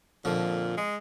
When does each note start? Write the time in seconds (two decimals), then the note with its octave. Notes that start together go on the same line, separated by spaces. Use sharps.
0.25 F2 A#2 D3 F3
0.77 G#3